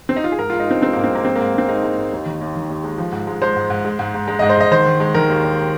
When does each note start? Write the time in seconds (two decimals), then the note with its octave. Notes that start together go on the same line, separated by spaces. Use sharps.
0.09 C4
0.16 D#4
0.24 F4
0.32 G#4
0.39 G#2 A#4
0.50 G#3 F4
0.60 D#4
0.68 G#3 C4
0.82 G#3 C4
0.93 G#2 A#3
1.04 C4
1.11 G#3 A#3
1.25 G#3 C4
1.36 G#2 A#3
1.54 G#3 C4
1.68 G#3 D#4
1.83 G#3
1.97 G#2
2.12 D#2
2.26 D#3
2.41 D#2
2.55 D#3
2.70 D#2
2.84 G#3
2.98 F3
3.12 G#2
3.27 G#3
3.42 G#3 C5
3.56 G#2
3.70 G#2
3.85 G#3
3.99 G#2
4.14 G#2
4.28 G#3
4.39 G#2 D#5
4.49 C5
4.57 G#2 D#5
4.71 D#3 C5
4.86 D#3
5.00 G#3
5.15 D#3 A#4
5.29 D#2
5.44 D#2